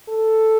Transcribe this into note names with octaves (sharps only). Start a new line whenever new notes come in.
A4